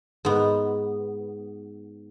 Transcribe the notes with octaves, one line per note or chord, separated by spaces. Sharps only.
G#2 B3